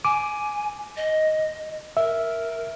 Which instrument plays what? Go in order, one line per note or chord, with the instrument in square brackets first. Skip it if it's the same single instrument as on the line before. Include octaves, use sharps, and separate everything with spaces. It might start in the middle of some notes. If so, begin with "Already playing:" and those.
[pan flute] G#5 [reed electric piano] D6
[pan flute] D#5
[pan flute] A#4 [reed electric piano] E5